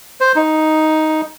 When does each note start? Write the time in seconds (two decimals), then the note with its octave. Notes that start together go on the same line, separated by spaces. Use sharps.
0.20 C5
0.36 D#4